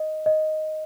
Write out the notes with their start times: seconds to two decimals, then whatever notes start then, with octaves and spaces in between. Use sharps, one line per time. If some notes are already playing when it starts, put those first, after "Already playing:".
Already playing: D#5
0.26 D#5